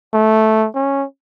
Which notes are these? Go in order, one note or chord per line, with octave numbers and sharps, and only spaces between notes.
A3
C#4